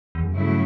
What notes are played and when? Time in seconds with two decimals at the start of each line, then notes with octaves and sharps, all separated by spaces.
0.15 E2
0.24 F#2
0.33 G2 C#3 F#3 A3 E4